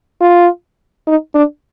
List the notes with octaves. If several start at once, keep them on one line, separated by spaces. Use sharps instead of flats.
F4
D#4
D4